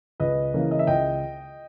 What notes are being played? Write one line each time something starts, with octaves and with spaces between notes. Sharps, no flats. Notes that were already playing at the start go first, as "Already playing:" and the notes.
C#2 B4 D#5
C#3 E3 A#3
D#5
E5
C#2 D#5 G5